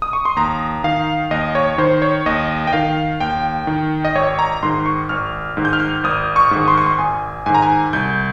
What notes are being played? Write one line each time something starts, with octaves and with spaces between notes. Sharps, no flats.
D#6
C#6
C6
D#2 A#5
D#3 F5
D#2 D#5
C#5
D#3 C5
C#5
D#2 D#5
G5
D#3 F5
D#2 G5
D#3
D#5
G#1 C#5
A#5
G#2 D#3 C6
C#6
G#1 F6
G#2 D#3
G6
F6
G6
G#1 D#6
C#6
G#2 D#3
C6
C#6
C6
G#1 G#5
G#2 D#3 G#5
A#5
G#5
C2 G6